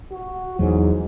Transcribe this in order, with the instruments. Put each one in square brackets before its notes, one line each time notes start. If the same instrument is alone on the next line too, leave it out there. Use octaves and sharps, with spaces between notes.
[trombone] F#4
[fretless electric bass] E2 F#3 [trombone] G#2